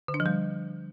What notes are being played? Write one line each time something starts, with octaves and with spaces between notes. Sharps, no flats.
D3
D4
F3
G3